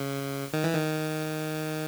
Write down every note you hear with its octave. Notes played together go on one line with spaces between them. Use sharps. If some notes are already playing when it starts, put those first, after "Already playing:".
Already playing: C#3
D#3
E3
D#3